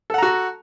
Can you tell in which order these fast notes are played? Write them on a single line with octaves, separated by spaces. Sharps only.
A4 F#5 A#5 F#4